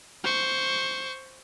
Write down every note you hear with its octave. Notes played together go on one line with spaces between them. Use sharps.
C5 C#6